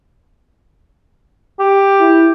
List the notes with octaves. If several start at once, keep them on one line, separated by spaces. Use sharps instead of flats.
G4
E4